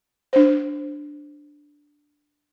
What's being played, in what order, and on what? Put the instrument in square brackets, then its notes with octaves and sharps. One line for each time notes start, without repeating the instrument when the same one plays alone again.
[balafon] D4 C5